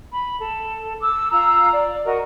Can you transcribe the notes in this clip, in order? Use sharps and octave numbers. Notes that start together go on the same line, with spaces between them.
B5
A4
D6 E6
F4 A#5 E6
D5
F#4 A#4 D#5